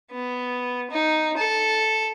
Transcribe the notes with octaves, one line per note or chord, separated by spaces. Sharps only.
B3
D#4
A4